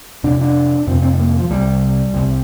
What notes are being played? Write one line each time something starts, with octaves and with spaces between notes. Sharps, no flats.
F2 C3 D4
D4
F2 C3 C4
C4
G#3
A#3
F3
C2 C3 G3
C2 C3